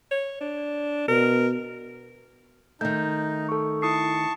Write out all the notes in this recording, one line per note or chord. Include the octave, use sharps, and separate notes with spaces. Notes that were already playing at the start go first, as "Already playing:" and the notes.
C#5
D4
B2 A#4
D#3 A3 D#4 G6
A4 C#6
E4 A5 C#6 D#6 C7